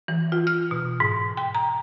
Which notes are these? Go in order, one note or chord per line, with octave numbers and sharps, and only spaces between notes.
E3
F4
F6
B2
G#2
G5
A#5